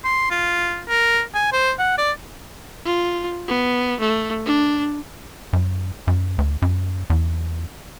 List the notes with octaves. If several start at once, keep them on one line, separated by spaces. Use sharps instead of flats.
C6
F4
A#4
G#5
C5
F#5
D5
F4
B3
A3
D4
F#2
F#2
D2
F#2
E2